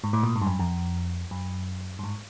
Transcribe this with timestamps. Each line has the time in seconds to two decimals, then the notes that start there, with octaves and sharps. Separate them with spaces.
0.04 G#2
0.13 A2
0.23 A#2
0.36 G#2
0.42 G2
0.47 F#2
0.59 F2
1.31 F#2
1.99 G2
2.04 G#2